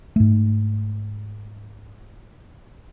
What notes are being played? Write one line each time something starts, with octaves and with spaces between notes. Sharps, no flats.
G#2 A3